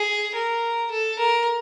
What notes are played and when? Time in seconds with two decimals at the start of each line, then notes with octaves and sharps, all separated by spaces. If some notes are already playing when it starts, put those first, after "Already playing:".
Already playing: G#4
0.35 A#4
0.91 A4
1.19 A#4